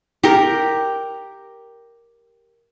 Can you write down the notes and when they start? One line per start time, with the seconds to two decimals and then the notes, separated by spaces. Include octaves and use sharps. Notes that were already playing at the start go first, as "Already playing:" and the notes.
0.23 G4 A#4